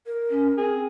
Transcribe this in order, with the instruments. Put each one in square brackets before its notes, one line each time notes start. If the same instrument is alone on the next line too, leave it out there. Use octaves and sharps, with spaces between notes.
[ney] A#4
[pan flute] C#4
[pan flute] C4 [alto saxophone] G#4